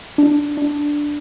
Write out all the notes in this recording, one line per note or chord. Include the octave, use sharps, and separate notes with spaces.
D4
D4